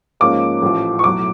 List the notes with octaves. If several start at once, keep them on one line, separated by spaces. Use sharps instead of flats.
G#2 F3 A#3 C#4 F4 D6
A1 A2 F3
C#6
B1 A2 F#3 D6